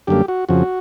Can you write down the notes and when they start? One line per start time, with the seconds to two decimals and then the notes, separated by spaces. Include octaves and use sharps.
0.07 F#2 D3 G3 A#3 G4
0.28 F#4
0.49 F2 C#3 F3 F#4